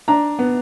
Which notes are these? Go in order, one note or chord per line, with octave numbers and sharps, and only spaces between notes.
D4 A#5
B3